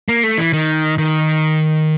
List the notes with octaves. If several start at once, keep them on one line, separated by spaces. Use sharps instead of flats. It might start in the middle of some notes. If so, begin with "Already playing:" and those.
A#3
A3
E3
D#3
D#3